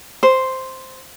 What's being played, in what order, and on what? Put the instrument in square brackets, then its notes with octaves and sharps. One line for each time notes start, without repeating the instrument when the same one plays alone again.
[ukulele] C5